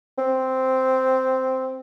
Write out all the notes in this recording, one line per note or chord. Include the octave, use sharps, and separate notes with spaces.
C4